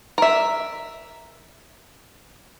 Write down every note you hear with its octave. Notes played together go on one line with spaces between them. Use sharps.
A#4 E5